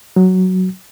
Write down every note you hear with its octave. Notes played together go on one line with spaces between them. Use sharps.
F#3